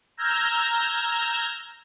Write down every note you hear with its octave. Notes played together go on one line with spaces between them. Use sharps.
A#5 E6 F6 G6 G#6 A#6